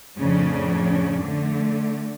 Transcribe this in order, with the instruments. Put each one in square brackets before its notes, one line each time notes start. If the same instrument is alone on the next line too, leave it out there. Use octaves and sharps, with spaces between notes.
[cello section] F2 A2 C#3 C#4 D4
D3 A3